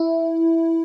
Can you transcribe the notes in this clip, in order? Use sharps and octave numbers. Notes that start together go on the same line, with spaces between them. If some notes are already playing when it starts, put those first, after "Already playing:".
Already playing: E4